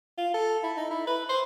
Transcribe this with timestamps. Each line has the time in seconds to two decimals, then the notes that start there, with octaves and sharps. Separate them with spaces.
0.18 F4
0.34 A4
0.63 E4
0.77 D#4
0.90 E4
1.07 B4
1.29 C5